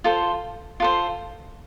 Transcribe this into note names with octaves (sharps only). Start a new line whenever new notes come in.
F4 A4 C5
F4 A4 C5